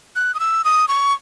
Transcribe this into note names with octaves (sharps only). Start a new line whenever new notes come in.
F#6
D#6
E6
D#6
C#6